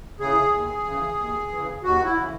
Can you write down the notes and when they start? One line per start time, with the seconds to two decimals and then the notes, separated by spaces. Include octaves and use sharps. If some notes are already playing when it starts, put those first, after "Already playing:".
0.19 C#3 E3 G#4
0.53 D#2
0.85 C#3 E3
1.18 D#2
1.51 C#3 E3
1.83 D#2 F#4
2.05 E4
2.15 C#3 E3